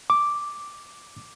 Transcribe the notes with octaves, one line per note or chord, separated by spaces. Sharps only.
D6